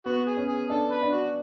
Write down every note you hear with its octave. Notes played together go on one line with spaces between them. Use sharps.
B3 F#4
G#4
C#4
G#4
D4 A4
B4
D4
F#4